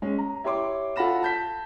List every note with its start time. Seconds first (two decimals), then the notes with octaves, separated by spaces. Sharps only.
0.02 G#3 C#4
0.19 A#5
0.44 E4 G4 C#5 C6 D6
0.96 F4 A4 F#5 B5 A#6 E7
1.23 A5 G6 B6